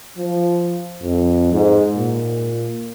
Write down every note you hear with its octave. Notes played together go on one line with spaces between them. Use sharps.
F3
F2
G#2
A#2